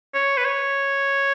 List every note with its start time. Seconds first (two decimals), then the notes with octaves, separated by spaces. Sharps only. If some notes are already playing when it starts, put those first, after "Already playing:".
0.14 C#5
0.37 B4
0.45 C#5